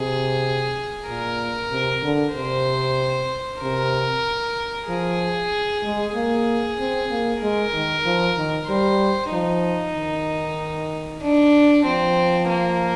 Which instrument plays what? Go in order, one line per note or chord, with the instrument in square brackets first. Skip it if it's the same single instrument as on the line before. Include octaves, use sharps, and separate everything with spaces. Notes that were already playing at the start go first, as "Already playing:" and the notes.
Already playing: [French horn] C3 [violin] G#4
[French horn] A#2 [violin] A#4
[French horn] C3
D3
[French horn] C3 [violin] C5
[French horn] C3 [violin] A#4
[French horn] F3 [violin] G#4
[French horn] G#3
[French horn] A#3 [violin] G#4
[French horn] C4
A#3
[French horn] G#3 [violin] A#4
[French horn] D#3
F3
D#3
[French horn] G3 [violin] C5
[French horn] F3 [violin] D#4
[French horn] D#3
[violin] D4
[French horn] F3 [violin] C4
[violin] A#3